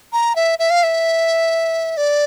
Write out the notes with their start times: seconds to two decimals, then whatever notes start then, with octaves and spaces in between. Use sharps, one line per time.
0.13 A#5
0.35 E5
0.59 E5
0.70 F5
0.83 E5
1.97 D5